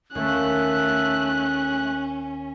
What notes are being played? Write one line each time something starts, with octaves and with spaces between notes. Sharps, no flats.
D#2 D#3 A3 C#4 C#5 F#6